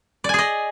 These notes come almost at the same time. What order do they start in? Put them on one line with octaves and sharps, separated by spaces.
D5 G#5 G#4 D#5